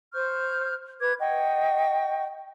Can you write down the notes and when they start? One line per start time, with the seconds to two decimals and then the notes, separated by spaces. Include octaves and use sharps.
0.13 C5 C#6 F6 G6
0.99 B4 D6 G#6
1.19 D#5 F#5 G5 C#6